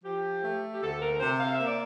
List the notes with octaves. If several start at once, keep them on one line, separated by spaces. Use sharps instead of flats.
F3 G4
A3
G4
D2 A4
A#4
C3 C5
F5
E5
A#3
D5